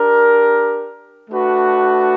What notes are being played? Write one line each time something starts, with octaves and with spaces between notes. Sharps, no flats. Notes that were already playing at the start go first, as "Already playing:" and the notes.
Already playing: D4 G4 A#4
A3 D4 F#4 B4